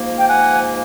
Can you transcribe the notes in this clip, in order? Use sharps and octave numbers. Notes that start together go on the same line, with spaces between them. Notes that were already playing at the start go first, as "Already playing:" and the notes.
Already playing: G#2 F3 A#3
G5
F#5 G#5